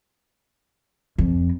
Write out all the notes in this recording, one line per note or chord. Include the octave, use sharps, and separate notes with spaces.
F2